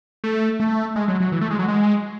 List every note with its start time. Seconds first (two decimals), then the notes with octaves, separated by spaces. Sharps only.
0.24 A3
0.60 A3
0.96 G#3
1.08 F#3
1.20 F#3
1.32 E3
1.41 A3
1.51 G#3
1.59 F#3
1.68 G#3